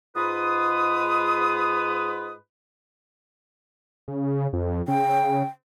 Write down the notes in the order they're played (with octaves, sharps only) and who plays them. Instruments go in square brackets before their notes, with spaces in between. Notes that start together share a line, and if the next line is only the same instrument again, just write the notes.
[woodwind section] G#2 F4 B4 D#6
[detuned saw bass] C#3
F2
[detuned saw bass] C#3 [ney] G5